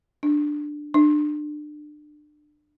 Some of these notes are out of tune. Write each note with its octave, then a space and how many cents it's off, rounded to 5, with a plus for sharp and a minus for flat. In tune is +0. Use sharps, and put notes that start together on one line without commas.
D4 +10
D4 +30